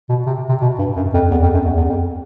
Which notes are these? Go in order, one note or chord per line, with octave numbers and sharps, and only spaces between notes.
B2
C3
C3
B2
G2
F#2
F2
E2
F2
F#2
E2
E2
F2